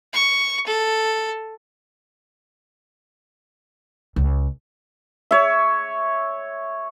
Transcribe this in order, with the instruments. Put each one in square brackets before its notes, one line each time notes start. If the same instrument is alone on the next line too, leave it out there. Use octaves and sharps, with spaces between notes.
[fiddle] C#6
A4
[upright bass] C#2
[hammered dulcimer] C#5 E5